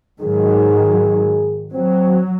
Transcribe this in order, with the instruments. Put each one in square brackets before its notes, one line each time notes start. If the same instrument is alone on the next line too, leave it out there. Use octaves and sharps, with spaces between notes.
[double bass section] G#2 D#3 F#3 [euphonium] G#4
[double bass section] F#3 [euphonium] C4